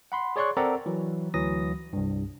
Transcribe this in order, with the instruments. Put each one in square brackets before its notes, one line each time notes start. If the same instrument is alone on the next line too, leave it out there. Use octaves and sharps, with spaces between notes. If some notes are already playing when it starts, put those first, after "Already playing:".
[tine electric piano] F#5 B5 C6
G#4 C#5 D5 C6 C#6 F#6
C4 A4 A#4 D5 F#5 A#5
E3 F#3
D2 E3 F#3 D#6 A#6
C2 G2